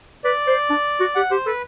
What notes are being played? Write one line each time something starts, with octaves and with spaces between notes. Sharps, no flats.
B4 D5
C5
D4
F#4
G4 F#5
G4 C5
A4 B4